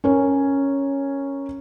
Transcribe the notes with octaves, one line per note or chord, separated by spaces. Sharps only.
C#4 A#4 C#5